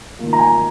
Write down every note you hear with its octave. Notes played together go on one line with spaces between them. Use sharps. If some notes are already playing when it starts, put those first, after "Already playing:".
D#3 A#3 F4
A#5
G#5